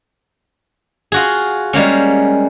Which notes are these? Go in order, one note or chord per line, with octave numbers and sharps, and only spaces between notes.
F4 F#4 G#4
G3 G#3 A#3 C#4